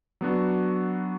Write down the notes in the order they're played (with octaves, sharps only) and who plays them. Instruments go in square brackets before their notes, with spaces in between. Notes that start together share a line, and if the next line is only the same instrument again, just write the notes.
[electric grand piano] F#3 B3 D4 F#4